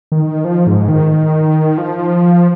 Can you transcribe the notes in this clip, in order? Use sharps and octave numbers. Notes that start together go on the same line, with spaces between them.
D#3
F3
G#2
D#3
F3